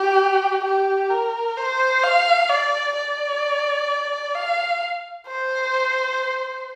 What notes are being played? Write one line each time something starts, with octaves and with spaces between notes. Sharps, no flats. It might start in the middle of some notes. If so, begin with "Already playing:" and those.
Already playing: G4
G4
A#4
C5
F5
D5
D5
F5
C5